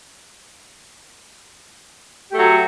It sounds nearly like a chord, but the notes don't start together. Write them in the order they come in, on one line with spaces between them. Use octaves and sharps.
G4 A3 F#3